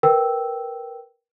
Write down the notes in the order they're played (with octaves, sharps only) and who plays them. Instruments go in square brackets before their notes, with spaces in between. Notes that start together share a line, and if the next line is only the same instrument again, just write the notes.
[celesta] A#4 B4 G5 E6